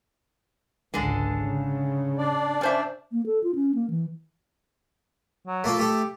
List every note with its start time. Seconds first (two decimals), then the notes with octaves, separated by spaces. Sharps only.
0.94 G#1 C#2 D3 G#3 A4
1.43 C#3
2.18 D4 D5
2.61 C#4 C5 E5
3.12 A#3
3.26 A4
3.44 F4
3.55 C#4
3.75 A#3
3.90 E3
5.47 F#3
5.64 A3 A#3 F4
5.79 A3 G4 A4